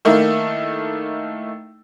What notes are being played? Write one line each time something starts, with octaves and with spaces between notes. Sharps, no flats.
D#3 A3 A#3 D#4 E4